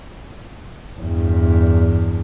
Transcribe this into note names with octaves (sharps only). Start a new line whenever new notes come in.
E2 G2